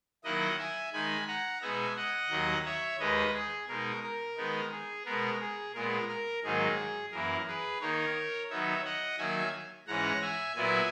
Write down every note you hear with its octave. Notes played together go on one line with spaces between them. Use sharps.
D#3 F#3 A#3 E4 D#5 F#5
E5 G#5
D#3 G#3 D#4 G#5 B5
F#5 A#5
B2 G#3 B3 D#4 E5 G#5
D#5 F#5
D#2 D#3 F#3 A#3
C#5 E5
D#2 D#3 G#3 B4 D#5
G#4
B2 G#3 D#4 A#4
A#4
D#3 G#3 B3 D#4
G#4
B2 G#3 B3 A#4
G#4
A#2 G#3 B3 A#4
A#4
G#2 D#3 F#3 A#3 D#4 G#4
F#2 E3 A#3 E4 A#4
G#4 B4
D#3 A#3 D#4 A#4 C#5
D#3 F#3 B3 D#4 C#5 E5
D#5 F#5
D#3 F#3 A#3 E5 G#5
G#2 E3 G#3 C#4 F#5 A#5
E5 G#5
A#2 F#3 B3 E4 E5 G#5